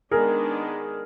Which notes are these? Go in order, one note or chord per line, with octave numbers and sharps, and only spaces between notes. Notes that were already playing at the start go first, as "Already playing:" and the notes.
D#3 G#3 B3 D4 G#4 A#4